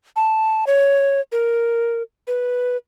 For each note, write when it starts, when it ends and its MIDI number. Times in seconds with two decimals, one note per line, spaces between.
0.16 0.64 81
0.67 1.21 73
1.32 2.02 70
2.27 2.77 71